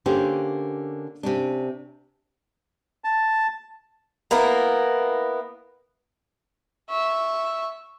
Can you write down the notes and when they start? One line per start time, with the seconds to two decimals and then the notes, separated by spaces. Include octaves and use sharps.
0.06 D3 A#3 C#4 G4 C5
1.23 C3 C#4 D4
3.04 A5
4.31 A#3 B3 E4 A#4
6.90 E5 C#6